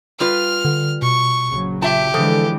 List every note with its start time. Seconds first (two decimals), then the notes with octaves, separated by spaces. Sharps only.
0.20 G3 F4 B4 F6
0.65 D3
1.02 B2 C#6
1.48 A#1 C#3 F#3
1.82 F4 G4 E5 A5
2.14 D3 E3 F3 G#3 A4